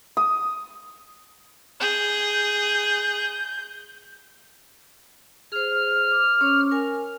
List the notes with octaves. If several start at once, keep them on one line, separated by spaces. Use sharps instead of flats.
D#6
G#4 G6
G#4 C5 F6
D6
C#4 C#5 D6
A#4 G#5